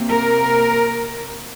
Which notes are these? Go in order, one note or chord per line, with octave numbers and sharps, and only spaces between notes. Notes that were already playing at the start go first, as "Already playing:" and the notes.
Already playing: C3 A#3
A#4